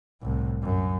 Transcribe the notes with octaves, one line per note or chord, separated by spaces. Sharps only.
C2 A2
F#2